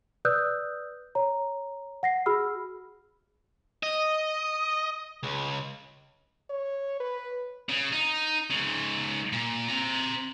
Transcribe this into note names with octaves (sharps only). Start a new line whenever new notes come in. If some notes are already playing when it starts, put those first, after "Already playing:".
B4 D5 D#6 E6 F#6 G6
C#5 A#5
F#5 A#6 C7
F#4 G#4 B5 E6 F6
D#5
C#2
C#5
B4
C#3
D#4
G#2 C#3
A#2
C4 A#5